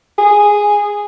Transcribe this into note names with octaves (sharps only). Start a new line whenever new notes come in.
G#4